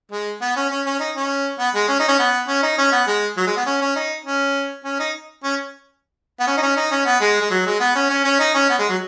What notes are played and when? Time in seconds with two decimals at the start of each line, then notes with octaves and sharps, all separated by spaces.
0.12 G#3
0.41 B3
0.56 C#4
0.70 C#4
0.86 C#4
1.00 D#4
1.16 C#4
1.59 B3
1.74 G#3
1.88 C#4
1.99 D#4
2.08 C#4
2.19 B3
2.47 C#4
2.63 D#4
2.78 C#4
2.92 B3
3.07 G#3
3.37 F#3
3.46 G#3
3.57 B3
3.66 C#4
3.81 C#4
3.96 D#4
4.25 C#4
4.84 C#4
4.99 D#4
5.44 C#4
6.40 B3
6.47 C#4
6.57 D#4
6.62 C#4
6.76 D#4
6.91 C#4
7.06 B3
7.21 G#3
7.40 G#3
7.50 F#3
7.66 G#3
7.80 B3
7.95 C#4
8.10 C#4
8.24 C#4
8.40 D#4
8.55 C#4
8.70 B3
8.79 G#3
8.89 F#3